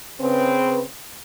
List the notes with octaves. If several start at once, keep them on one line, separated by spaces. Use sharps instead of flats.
C#3 C4 B4